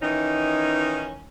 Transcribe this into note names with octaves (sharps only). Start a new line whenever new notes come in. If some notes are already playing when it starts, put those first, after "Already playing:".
D#3 E3 C#4 D#4